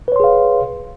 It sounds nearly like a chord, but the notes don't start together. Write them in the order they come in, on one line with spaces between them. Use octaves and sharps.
B4 C#5 C6 G#4 F5